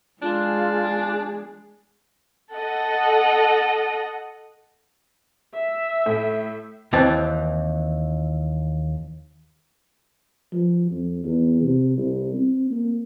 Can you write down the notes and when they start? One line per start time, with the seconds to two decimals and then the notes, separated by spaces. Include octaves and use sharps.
0.22 G#3 D4 F4 G#4
2.54 A4 D#5 F#5
5.54 E5
6.06 A2
6.93 D#2 E3 C4 A5
10.53 F3
10.91 F2
11.24 E2
11.62 C3
11.97 C2
12.34 C4
12.71 A#3